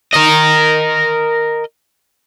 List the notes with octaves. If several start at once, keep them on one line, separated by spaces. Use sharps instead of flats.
A#4 D#5